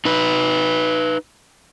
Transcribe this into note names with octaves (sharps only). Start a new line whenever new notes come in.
D#4 B4